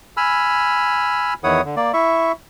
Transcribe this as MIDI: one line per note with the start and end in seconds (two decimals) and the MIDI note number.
0.17 1.34 80
0.17 1.34 83
0.17 1.34 88
0.17 1.34 89
1.44 1.61 40
1.44 1.61 51
1.44 1.61 64
1.44 1.61 73
1.44 1.61 78
1.44 1.61 87
1.65 1.75 50
1.77 1.92 58
1.77 1.92 74
1.93 2.32 64
1.93 2.32 76
1.93 2.32 85